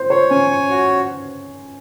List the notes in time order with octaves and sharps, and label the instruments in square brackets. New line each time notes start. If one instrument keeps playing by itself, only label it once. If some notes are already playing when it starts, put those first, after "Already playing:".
Already playing: [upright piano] C5
[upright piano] C5 [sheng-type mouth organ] C#5
[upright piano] C#4 [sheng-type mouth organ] G#5
[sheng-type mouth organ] C#5
F#4